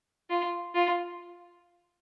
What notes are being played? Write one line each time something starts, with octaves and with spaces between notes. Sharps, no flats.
F4
F4